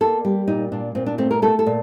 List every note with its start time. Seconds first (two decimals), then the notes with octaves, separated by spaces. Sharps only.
0.01 A#3 A4
0.24 G3 G4
0.47 A#2 D#4
0.72 A#2 D4
0.95 A#2 C4
1.06 D4
1.18 A3 C4
1.31 A#4
1.42 A3 A4
1.59 A4
1.66 A#2